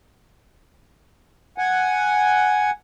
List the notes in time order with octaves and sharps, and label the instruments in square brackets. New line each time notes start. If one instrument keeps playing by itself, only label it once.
[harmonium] F#5 G#5